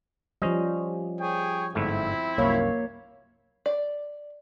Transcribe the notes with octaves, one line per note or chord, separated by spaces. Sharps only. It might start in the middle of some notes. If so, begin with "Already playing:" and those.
F3 G3 C#4 C5 D#5
G#4 C#5 G5
G1 G#2 A3 C4 E4
C2 F#2 A#3 C#5 F5
D5